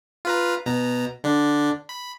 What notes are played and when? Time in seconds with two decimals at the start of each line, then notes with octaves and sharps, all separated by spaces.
0.25 F4 B4 A#5
0.66 B2 A#5
1.24 D3 D4
1.89 B5